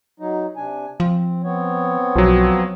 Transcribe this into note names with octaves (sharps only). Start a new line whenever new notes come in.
F#3 D#4
C3 D4 G#5
F3 C4
B3 C4 C#5
B1 F3 F#3